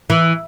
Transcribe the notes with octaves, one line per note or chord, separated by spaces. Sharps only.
E3